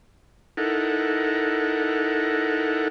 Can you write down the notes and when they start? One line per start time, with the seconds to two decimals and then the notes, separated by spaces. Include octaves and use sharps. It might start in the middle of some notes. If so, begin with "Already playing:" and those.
0.57 D#4 E4 A4 A#4 F#5